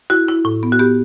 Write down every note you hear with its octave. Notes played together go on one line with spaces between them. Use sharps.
E4 F#4
E4
A2
B3
F#4
B3 G4